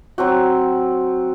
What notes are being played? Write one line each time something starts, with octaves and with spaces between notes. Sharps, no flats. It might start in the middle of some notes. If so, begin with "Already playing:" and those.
F#3 C4 F#4